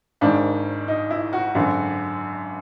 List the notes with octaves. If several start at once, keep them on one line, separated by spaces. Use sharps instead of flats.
G#1 G#2 D#3 D4
D#4
E4
F#4
G#1 F#2 D3